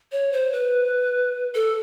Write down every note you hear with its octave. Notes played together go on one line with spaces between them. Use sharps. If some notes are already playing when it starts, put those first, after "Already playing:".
C#5
C5
B4
A4